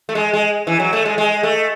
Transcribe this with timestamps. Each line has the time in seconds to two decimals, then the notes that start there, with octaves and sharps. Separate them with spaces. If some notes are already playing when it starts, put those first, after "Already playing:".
0.09 A3
0.15 G#3
0.33 G#3
0.67 E3
0.80 F#3
0.93 A3
1.05 G#3
1.18 G#3
1.43 A3